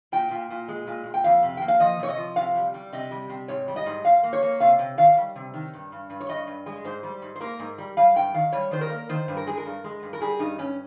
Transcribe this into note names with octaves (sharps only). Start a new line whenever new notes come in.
A#2 G5
A#2
A#2
G#3
A#2
A#2
G5
F2 F5
C3
A#3 G5
F5
F3 D#5
C3 C#5
D#5
F3
C3 F5
G3
G3
C3 D#5
G3
C3
G#2 C#5
G3
D#5
G#2
G#2 F5
A#3
C#5
A#3
C3 F5
C3
D#3 F5
G3
C3
D#3
G2
G2
G2
C#5
G2 D#5
G2
G#3
G#2 C5
G3
G#2
C5
A#3 A#4
G#2
G3
G3 F5
G2 G5
D#3 F5
G3 C#5
D#3 C5
A#4
A#3
D#3 C5
G2
A#4
G#3 G#4
A#4
G2
G#3
G2
A#4
G3 G#4
G2 D#4
G2 C#4